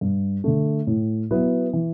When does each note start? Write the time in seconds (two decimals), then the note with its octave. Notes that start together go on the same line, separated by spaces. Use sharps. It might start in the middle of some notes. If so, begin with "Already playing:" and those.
0.01 G2
0.44 D3 A3
0.87 A2
1.31 F#3 B3 E4 B4
1.73 E3